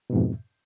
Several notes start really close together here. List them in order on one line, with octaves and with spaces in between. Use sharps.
B2 G#2 F2